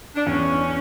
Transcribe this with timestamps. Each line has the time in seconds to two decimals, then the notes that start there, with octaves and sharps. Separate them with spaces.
0.15 D4
0.26 E2 C#4